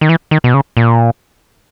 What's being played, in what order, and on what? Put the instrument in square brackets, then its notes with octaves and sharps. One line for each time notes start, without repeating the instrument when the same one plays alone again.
[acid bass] D#3
E3
D#3
B2
C#3
A#2